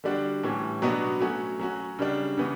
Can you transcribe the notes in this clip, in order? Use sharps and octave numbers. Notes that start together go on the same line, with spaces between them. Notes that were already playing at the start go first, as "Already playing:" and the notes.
D3 G3 D4 F#4
A2 E3 G3 C#4
B2 F#3 B3 D4 F#4
F#3 A3 C#4 F#4
F#3 C#4 F#4
C#3 G3 D4
C#3 E3 B3